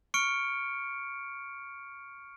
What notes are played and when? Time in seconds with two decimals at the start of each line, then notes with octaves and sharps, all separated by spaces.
0.14 C#6 F6 C#7 D7